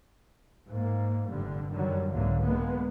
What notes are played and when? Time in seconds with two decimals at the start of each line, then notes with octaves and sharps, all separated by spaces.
0.67 G#2 A#3
1.28 F1 G2 D3 G3
1.70 F#2 D3 D#3 F#3 G3
2.12 C2 G#2 D3 E3 F#3 A#3
2.41 D3 G#3 A#3 B3